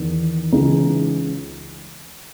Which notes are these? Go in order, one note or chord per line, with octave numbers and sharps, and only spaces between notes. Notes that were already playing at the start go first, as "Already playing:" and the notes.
Already playing: E2 D#3
C#2 C#3 E3 D#4